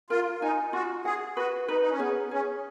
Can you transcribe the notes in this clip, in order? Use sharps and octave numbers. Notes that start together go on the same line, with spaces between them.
F4 A#4
D#4 G#5
F4 F#4
G#4 F#5
F#4 B4
D#4 B4
D#4
C#4
B3 G#4
C#4 G#4